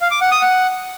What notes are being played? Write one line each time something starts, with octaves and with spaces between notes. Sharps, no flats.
F5
D6
F#5
D#6
F#5